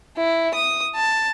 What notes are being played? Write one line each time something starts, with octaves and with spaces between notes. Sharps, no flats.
E4
D#6
A5